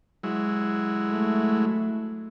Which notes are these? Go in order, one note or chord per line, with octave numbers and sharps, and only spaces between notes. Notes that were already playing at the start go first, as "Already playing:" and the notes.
F#3 G#3 E4
A3